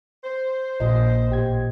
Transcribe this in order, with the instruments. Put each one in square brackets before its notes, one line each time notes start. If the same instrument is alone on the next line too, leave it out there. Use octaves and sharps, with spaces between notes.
[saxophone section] C5
[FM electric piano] A#1 [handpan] A#2 D#5
[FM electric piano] A1 G4 G#6